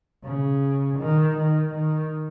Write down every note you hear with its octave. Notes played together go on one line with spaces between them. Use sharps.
C#3
D#3
D#3
D#3